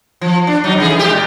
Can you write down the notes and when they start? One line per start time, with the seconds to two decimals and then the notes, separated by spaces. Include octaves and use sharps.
0.21 F3
0.47 D4
0.64 F#3 D#4
0.78 C#3 E3 G#4
0.98 A#2 G#3 G4
1.10 A#2